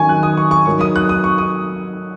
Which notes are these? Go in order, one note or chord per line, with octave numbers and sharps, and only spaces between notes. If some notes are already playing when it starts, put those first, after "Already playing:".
Already playing: D#3 F#3 C#4 G#5 C#6
F#6
D#6
C#6
C#6
F#3 D#4 A#4 C#5 C#6
D#6
F#6
D#6
C#6
D#6